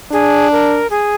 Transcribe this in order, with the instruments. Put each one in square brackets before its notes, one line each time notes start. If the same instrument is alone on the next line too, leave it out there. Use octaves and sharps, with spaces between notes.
[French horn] D4 [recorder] G#4
[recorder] A#4
G#4